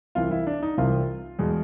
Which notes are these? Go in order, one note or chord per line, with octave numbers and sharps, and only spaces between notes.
C2 C3 E3 F4
E4
D4
D#4
C2 C3 E3 F4
E2 B2 G#3